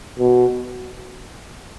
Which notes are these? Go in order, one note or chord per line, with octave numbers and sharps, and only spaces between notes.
B2